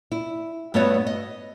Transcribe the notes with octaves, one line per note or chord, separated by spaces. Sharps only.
E4
G2 A3 B3 F#4 C#5 D#5
D#5